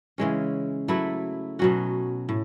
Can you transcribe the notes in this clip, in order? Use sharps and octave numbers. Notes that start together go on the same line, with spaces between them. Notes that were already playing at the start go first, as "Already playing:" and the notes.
C#3 E3 G#3 C#4
F#3 A3 E4 B4
B2 F#3 C#4 F#4
A2